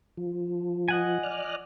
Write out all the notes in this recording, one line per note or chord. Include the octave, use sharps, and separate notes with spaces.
F3
D#5 F#5 G#5
D5 F6 F#6